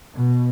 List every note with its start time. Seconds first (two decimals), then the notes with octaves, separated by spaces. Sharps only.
0.14 B2